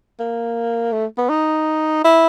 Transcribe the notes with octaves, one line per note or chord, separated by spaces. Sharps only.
A#3
A3
B3
D#4
E4